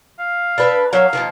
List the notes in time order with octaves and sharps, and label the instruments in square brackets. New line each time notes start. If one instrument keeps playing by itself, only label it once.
[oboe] F5
[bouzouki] D4 A4 B4
[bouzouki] F#3 A#3 C#4 [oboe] F5
[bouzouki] D#3 F3 A#3